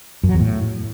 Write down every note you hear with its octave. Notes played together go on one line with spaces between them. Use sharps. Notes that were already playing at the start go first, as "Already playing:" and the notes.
F#2
F#3
E2
A2